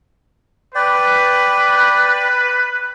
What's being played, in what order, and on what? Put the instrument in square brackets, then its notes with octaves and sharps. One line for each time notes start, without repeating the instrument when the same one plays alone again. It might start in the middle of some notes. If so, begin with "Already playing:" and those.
[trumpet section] B4 [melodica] D5 G5